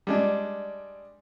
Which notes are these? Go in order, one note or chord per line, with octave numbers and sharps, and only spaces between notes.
G3 G#3 D4